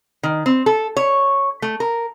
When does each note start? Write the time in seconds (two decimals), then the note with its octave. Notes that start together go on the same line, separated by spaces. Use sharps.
0.23 D#3
0.46 C4
0.66 A4
0.97 C#5
1.62 A3
1.80 A#4